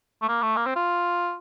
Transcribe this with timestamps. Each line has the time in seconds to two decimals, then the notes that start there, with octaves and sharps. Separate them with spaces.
0.22 A3
0.29 A#3
0.43 A3
0.57 A#3
0.66 C4
0.76 F4